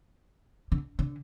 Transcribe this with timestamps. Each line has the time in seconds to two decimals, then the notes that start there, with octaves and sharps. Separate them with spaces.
0.72 D3
0.99 D3